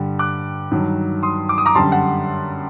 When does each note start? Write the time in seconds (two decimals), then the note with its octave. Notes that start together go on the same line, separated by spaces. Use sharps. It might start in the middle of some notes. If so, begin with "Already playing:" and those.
Already playing: G2 D3 G3
0.19 D6 F#6
0.71 G2 D#3 F#3
1.23 C6 D#6
1.49 D6
1.58 D#6
1.66 A#5 D6
1.75 F#2 D3 G3 A5 C6
1.92 F#5 A5